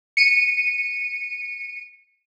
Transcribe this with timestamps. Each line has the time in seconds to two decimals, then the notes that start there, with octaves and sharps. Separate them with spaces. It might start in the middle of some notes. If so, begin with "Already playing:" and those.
0.17 C#7 D#7